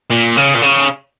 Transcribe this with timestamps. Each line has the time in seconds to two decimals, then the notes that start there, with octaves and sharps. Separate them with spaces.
0.11 A#2
0.37 C#3
0.55 A#2
0.62 C#3